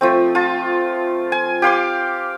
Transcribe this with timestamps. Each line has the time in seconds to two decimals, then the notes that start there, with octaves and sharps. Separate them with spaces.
0.01 F3 A3 C4
0.35 F4 A5
1.32 G#5
1.62 G4 F5 C6 D6